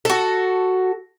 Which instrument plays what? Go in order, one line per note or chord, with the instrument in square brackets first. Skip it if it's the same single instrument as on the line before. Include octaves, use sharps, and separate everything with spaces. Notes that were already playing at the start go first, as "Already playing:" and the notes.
[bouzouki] F#4 A4